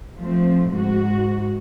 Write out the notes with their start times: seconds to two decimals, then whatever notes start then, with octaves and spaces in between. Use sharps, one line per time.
0.21 F3 A3 C4
0.71 G#2 F#4